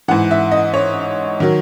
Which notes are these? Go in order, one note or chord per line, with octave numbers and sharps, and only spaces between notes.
G#2 E3 F#5
E5
D#5
C#5
D#3 F#3